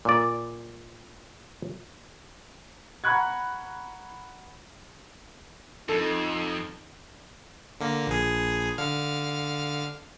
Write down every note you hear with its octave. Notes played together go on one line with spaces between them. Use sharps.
A#2 D5
F#5 A#5 B5 C#6 F#6 G#6
F2 D#4 A4
D3 A#3
A#1 G#4
D3 F5 F6